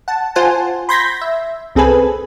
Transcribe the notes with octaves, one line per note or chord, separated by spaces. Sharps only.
F#5 A5
F4 C5 F#5 G#5 A5
B5 C6 G6 G#6 A#6 B6
E5
C2 C4 G#4 A4 B4 G#5